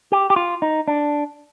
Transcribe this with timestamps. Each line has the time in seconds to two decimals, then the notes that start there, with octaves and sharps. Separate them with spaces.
0.12 G4
0.30 G4
0.36 F4
0.62 D#4
0.88 D4